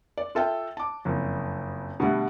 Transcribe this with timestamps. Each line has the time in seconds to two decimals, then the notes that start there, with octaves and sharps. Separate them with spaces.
0.18 D5
0.35 F4 A4 E5 G5
0.77 A5 D6
1.05 F#1 F2
2.00 B2 D3 G3 A3